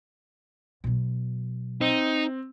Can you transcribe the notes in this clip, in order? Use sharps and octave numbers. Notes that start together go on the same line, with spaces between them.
B2 F#3
C4 D#4